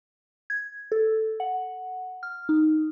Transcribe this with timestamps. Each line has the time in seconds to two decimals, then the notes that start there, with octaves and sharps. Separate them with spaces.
0.50 G#6
0.92 A4
1.40 F#5
2.23 F6
2.49 D#4